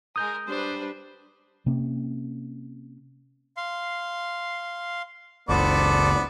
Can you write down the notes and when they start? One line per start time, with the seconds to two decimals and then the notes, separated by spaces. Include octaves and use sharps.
0.16 G#3 A#4 D#6 G6
0.48 G3 D4 B4 C5
1.66 C3 A#3 C#4
3.57 F5 C6
5.49 F#1 C#2 B3 A4 C5 D5 D6